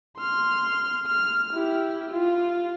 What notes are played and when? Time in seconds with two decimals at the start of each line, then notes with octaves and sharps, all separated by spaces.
0.18 C6 F6
1.07 F6
1.53 E4 G4
2.11 F4